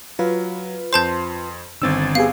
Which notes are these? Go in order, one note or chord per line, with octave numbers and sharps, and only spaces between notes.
F#3 F4 B4
F2 C5 A5 C6 G6
G1 D3 D#3 C4 E6 A6
B3 G4 G#4 F5